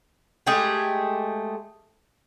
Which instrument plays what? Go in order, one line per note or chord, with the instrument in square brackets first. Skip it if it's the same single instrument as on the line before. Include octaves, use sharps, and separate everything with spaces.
[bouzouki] G#3 A3 G4 G#4